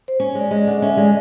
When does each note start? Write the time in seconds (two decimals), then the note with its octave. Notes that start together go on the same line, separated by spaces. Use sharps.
0.08 C5
0.20 C#4 C#5
0.35 G#3 D5
0.51 G#3 D#5
0.67 D3
0.82 C#4 E5
0.90 D#5
0.97 G#3 D5
1.06 D#5